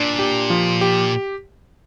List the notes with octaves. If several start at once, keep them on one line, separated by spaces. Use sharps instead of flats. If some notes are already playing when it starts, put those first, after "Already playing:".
Already playing: A#2 D4
G4
F3
G4